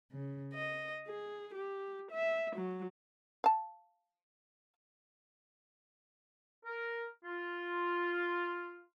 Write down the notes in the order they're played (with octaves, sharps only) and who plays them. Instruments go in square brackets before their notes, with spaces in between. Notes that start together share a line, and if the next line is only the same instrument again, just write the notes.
[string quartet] C#3
D#5
G#4
G4
E5
F#3
[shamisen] F5 A5
[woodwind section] A#4
F4